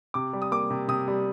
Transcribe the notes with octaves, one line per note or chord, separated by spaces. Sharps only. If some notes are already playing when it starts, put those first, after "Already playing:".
C3 D6
G3
D#6
A#3 D6
C3
C3 D#6
G3